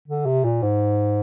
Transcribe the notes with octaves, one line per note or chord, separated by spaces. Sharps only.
D3
C3
A#2
G#2